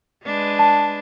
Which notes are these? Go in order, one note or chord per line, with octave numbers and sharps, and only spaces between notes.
G#3 D4 B4
A5